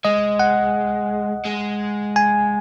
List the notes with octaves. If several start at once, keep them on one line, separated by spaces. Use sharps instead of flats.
G#3 D#5
F#5
G#3
G#5